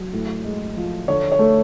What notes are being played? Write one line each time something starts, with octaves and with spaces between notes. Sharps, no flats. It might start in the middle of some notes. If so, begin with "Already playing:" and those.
Already playing: F#3
A2
G#3
F3
D3 C#5
C#5
A3